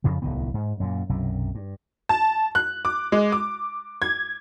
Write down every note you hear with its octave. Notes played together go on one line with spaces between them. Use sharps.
F2 C#3 F3
D1 C2 D#3 B3
G#2
F#2 A#2
B1 F#2 C3
G2
A5
F#6
D6
G#3
D6
G#6